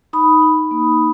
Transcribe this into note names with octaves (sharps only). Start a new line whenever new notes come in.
D#4 B5 D#6
D#4
A#3